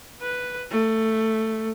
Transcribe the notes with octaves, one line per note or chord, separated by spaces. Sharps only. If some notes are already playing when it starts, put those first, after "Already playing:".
B4
A3